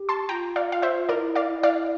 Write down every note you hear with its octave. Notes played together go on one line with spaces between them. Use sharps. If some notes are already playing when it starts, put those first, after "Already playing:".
Already playing: G4
A5 C6
F4 G5 A#5
D5 F5
F5
C5 E5
E4 A#4 D5
D5 F5
E4
D5 F5